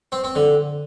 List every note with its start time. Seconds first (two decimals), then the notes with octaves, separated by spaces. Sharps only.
0.12 C4
0.24 C4
0.36 D3